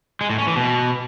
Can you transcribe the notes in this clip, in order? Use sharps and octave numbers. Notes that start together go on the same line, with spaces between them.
G#3
A2
C#4
E3
B2